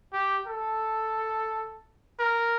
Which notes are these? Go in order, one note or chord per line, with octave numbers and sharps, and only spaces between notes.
G4
A4
A#4